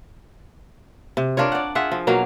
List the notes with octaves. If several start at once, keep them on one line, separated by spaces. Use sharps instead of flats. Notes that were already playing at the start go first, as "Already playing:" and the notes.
C3
D4 F4 A#4 C#5
D5 F#5
F4 G#4 E5 F#5
F3
B2 F#3 A#3 F5